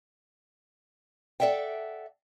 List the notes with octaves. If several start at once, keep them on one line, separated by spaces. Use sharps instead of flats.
A4 D5 E5 F#5 G5